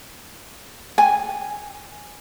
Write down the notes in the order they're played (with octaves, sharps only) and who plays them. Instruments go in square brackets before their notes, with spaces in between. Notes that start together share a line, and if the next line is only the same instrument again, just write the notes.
[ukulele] G#5